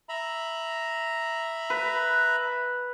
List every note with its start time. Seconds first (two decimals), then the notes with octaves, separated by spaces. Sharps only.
0.09 E5 A#5 B5
1.70 B4